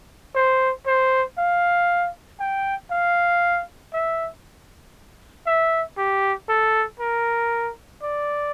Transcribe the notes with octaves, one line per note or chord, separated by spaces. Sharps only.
C5
C5
F5
G5
F5
E5
E5
G4
A4
A#4
D5